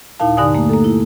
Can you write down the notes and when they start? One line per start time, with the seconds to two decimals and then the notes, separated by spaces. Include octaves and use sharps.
0.19 D#2 A#2 D#4 E4 F5 A5
0.37 G2 D3 D#4 D5 G#5 D#6
0.55 A3 A#3
0.69 A#3 A4
0.84 E4